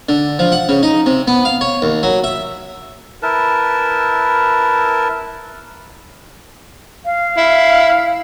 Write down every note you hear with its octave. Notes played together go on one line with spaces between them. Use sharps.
D3
F3
F#5
C#3
D#4
C3
B3
F5
C#5
D#2
F#3
E5
E4 A#4 B4 A5
F5
E4